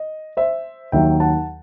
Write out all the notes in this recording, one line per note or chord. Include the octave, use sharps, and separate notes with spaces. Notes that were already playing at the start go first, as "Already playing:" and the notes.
Already playing: D#5
C5 E5
D#2 D#3 F#3 E5 G5
F#5 A5